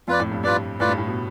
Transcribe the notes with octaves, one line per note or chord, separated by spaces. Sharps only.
F2 F4 B4 D5
A2
G2
G2 F4 B4 D5
A2 F4 B4 D5
G2
A2
B2